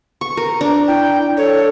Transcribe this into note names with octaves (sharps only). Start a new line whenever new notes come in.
C#6
A#4
D4 A#5
E4 G5
A4 C#5